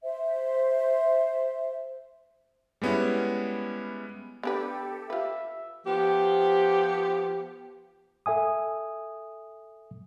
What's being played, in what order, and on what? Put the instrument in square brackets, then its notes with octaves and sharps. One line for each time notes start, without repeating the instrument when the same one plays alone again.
[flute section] C5 E5
[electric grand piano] G3 G#3 B3 C#4 E4
[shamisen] B3 D4 B4 [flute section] G4 A4
[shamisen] F4 B4 [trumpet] E5
[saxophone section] F3 B3 G4
[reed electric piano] A4 E5 G#5 D#6